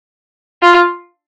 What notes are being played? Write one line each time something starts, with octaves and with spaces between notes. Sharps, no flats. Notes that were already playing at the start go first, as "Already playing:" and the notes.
F4